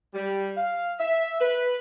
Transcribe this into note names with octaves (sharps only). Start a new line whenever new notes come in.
G3
F5
E5
B4